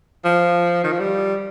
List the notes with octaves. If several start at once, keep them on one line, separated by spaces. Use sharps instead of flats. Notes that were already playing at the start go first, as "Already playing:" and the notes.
F3
D#3
F3
G3